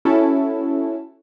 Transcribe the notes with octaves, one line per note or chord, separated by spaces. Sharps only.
C#4 E4 F#4 A4